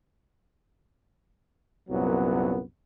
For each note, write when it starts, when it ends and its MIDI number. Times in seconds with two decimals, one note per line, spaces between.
1.89 2.61 36
1.89 2.61 42
1.89 2.61 46
1.89 2.61 54
1.89 2.61 59